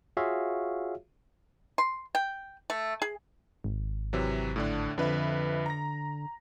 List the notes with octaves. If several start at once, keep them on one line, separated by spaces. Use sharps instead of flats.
F4 F#4 G#4 C#5 E5 F5
C6
G5
A3
G#4
G#1
C3 E3 F#3
A2 D3 D4
F2 D3 B4 E5
A#5 A#6